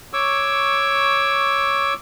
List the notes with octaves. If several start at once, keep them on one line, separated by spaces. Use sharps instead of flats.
C#5 C#6 D6 E6